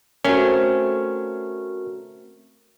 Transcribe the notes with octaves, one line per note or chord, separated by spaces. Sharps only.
A3 C4 C#4 F#4 A#4